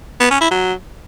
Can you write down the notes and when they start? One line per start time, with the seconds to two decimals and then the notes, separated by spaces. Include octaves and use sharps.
0.20 B3
0.31 C#4
0.41 E4
0.51 F#3